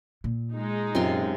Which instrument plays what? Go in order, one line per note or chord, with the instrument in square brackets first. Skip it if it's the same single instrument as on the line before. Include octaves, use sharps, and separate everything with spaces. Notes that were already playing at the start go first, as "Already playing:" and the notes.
[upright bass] A#2
[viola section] G#3 D#4
[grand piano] F#2 [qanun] C3 F4 C6